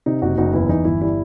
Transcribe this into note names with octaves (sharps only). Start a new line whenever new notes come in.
C3 D#4
F#1 D#4 F#4
F#1 D#4 F#4
E2 E4
E3 D#4
G1 E4
G3 E4